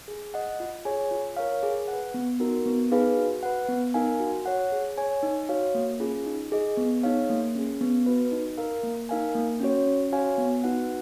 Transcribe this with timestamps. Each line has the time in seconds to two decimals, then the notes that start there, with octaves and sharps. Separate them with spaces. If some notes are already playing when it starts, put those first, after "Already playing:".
0.08 G#4
0.34 D#5 F#5
0.60 F4
0.85 G#4 C#5 G#5
1.11 F4
1.37 A#4 C#5 F5
1.63 G#4
1.88 F#5
1.93 B4
2.14 B3
2.40 D#4 F#4 A#4
2.66 B3
2.91 D#4 G#4 B4 F5
3.17 F#4
3.43 B4 F#5
3.68 B3
3.94 D#4 A#4 F5 G#5
4.20 F#4
4.46 C#5 F#5
4.72 G#4
4.98 C#5 G#5
5.23 D#4
5.49 F#4 C#5 F5
5.75 A#3
6.00 C#4 F4 G#4
6.26 D#4
6.52 G#4 D#5
6.77 B3
7.03 D#4 G#4 C#5 F5
7.30 A#3
7.55 C#4 G#4
7.81 B3
8.06 F#4 B4
8.32 D#4
8.58 A#4 F5
8.83 A#3
9.09 D#4 A#4 F5 G#5
9.35 A#3
9.60 C#4 F#4 C#5
9.87 C#4
10.12 F#4 C#5 F5 G#5
10.38 B3
10.64 D#4 F#4 B4 F#5